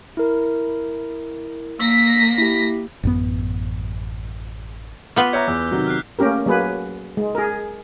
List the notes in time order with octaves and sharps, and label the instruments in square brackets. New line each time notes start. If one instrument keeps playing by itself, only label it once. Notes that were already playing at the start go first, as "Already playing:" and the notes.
[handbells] E4 A#4
[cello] A#3 [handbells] E6 [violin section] A#6 B6
[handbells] E4 G4
[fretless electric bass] A1 F#2 B3
[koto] B3 F4 [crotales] D6 B6 G7
[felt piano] C#5 E5 A#5 [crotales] D6 F#6 G6
[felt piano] E2 [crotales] D6 E6
[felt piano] C3 D#3 F#3
[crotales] F6 F#6 C7
[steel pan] A3 A#3 C#4 G4 A#4
F#3 A#3 G#4 B4
G#3
G#4 A#4